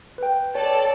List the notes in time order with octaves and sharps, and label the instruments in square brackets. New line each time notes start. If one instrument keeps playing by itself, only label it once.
[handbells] B4 G5
[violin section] A4 D5 A5 [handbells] C#5